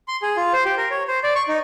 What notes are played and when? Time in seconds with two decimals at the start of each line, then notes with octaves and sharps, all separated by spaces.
0.08 C6
0.22 G#4
0.36 F4
0.53 C5
0.65 G4
0.77 A#4
0.91 C#5
1.08 C5
1.24 D5
1.35 C#6
1.48 D#4